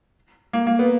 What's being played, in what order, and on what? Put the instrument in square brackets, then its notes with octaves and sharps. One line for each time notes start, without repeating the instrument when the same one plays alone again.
[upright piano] A#3
A#3
B3